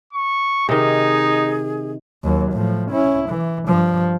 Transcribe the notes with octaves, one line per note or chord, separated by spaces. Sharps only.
C#6
C3 D#3 D#4 G#4
D#2 F#3
A2 F3
C#4 E4
E3
G2 F3